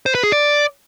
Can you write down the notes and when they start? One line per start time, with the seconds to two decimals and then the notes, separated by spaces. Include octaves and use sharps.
0.06 C5
0.15 B4
0.23 G#4
0.32 D5